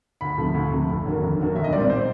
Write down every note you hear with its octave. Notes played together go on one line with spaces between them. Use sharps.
D2 B5
C3 F3 A3
D2
C3 F3 A3
F1
D#2 D3 F#3 A#3
F1
D#2 D3 F#3 A#3
B1 E5
D#5
A#2 G3 C4 D5
C5